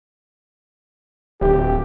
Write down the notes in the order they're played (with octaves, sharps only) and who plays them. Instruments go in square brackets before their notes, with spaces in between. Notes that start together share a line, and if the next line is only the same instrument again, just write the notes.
[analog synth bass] D1 [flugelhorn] G4